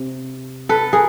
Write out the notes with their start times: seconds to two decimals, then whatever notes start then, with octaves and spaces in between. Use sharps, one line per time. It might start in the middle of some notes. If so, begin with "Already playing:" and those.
Already playing: C3
0.69 A4 B4
0.93 G#4 A#4